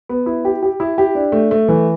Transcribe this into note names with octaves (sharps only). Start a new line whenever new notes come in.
B3
E4
G4
G4
E4
G4
D4
A3
A3
E3